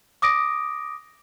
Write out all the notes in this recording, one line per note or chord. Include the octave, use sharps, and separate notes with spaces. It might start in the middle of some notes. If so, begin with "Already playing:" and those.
D6 D#6 A#6 D7